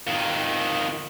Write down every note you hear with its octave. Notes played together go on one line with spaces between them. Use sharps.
F2 D#3